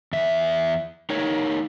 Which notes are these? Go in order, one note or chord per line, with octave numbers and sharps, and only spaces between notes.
E2 E5
D#4 A#4 C#5